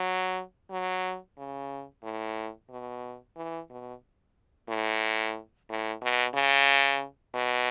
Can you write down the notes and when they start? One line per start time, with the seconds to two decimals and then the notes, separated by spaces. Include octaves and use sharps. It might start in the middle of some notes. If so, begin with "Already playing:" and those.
Already playing: F#3
0.71 F#3
1.37 C#3
2.03 A2
2.70 B2
3.36 E3
3.70 B2
4.69 A2
5.69 A2
6.02 B2
6.35 C#3
7.35 B2